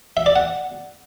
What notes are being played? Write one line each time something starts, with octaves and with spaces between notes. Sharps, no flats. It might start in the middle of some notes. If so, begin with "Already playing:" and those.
E5
D5
F#5